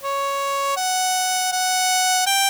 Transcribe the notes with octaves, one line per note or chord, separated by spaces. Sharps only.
C#5
F#5
F#5
G5